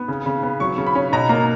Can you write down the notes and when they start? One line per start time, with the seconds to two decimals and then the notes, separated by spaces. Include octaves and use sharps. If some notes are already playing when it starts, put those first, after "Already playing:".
Already playing: B3
0.08 C#3
0.26 C#3
0.43 B3
0.60 F#3 C#6
0.78 C#3
0.86 B5
0.95 C#4
1.13 B2 A#5
1.29 A#3 A#5